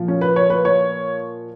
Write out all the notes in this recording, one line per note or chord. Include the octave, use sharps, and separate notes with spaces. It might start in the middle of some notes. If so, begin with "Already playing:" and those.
Already playing: A#2 F3
C#4
B4
C#5
B4
C#5